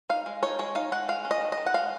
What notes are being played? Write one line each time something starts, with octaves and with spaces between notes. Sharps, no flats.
D#4 F5
G#3
D#4 C#5
G#3 C#5
D#4 F5
G#3 F#5
G#3 F5
C#4
D#5
D#3
D#5
D#3
F#5
G#3 F5